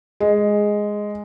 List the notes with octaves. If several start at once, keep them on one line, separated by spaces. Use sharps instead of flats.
G#3